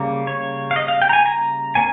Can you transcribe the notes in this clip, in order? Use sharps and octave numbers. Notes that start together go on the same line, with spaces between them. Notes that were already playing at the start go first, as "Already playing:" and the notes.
Already playing: C#3 G3 A#3
C#5
F5
D#5
F5
G5
A#5
G#5
A#5
A#3 C#4 G#5